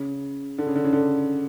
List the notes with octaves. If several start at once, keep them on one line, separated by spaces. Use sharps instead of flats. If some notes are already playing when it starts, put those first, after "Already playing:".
Already playing: C#3
D3
C#3
D3
C#3
D3